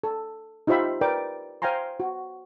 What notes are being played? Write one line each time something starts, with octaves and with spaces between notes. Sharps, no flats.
A4
D#4 F4 G4 C5 E5 B5
A#4 B4 D5 G5 D6
C5 F5 G5 G#5 A#5 C6
F#4